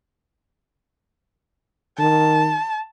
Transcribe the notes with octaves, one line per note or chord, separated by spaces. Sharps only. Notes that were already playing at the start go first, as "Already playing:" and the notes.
D#3 A5